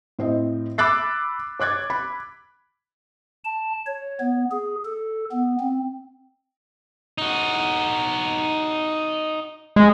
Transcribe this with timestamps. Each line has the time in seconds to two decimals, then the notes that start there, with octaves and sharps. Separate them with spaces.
0.19 A2 C4 D#5
0.78 B5 D6 E6 F#6 A6 C7
1.60 C#5 D6 F#6 G#6 A6
1.90 B5
3.45 A5
3.87 C#5
4.20 B3
4.51 G#4
4.85 A4
5.31 B3
5.60 C4
7.18 D#4 F#4
9.76 G#3